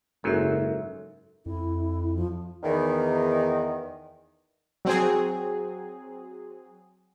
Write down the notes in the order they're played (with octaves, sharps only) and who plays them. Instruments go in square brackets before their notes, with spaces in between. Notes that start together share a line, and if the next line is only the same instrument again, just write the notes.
[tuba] F#1 [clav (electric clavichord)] G#2 F#3 [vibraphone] A4 A#4 E5
[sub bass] F2 [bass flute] E4
[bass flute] F3
[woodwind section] E2 D#3
[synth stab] F#3 C4 G#4